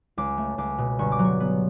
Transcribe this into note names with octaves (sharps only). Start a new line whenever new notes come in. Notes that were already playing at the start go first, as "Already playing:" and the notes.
C#2 D6
A3
C#2 D6
B2
G1 C#6
D6
F#3
C#6
B3